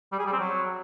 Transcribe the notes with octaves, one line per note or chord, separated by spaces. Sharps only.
G3
G#4
G3
C4
F#3